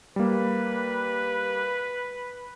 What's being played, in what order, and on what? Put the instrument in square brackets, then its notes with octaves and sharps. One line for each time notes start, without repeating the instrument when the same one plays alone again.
[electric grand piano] G3 A#3 [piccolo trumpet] B4